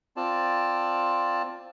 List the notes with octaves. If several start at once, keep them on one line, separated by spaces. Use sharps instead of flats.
C4 F4 D5 A5